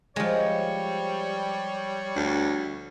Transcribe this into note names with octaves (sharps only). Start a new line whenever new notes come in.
F3 G3 G#3 C#5
D2